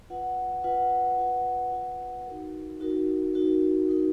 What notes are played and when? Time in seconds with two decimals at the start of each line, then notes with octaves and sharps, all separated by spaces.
0.10 F4 B4 F#5
0.64 F4 B4 F#5
1.18 F4 B4 F#5
1.72 F4 B4 F#5
2.26 D#4 F#4 A#4
2.80 D#4 F#4 A#4
3.34 D#4 F#4 A#4
3.89 D#4 F#4 A#4